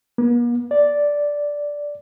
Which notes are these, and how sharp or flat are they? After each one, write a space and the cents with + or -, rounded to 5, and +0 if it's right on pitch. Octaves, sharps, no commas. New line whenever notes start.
A#3 +45
D5 -5